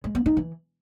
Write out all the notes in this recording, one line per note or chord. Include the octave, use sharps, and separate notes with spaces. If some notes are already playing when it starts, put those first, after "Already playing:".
G#3
B3
D#4
E3